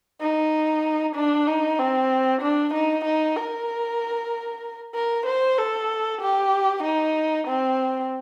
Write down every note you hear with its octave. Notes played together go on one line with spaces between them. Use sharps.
D#4
D4
D#4
C4
D4
D#4
D#4
A#4
A#4
C5
A4
G4
D#4
C4